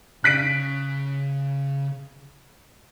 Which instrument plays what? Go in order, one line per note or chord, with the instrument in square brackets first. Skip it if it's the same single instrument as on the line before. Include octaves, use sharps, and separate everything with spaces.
[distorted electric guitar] C#3 [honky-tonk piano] F#6 B6 D7